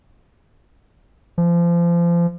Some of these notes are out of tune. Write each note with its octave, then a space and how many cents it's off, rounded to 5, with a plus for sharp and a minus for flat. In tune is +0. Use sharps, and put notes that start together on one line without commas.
F3 -30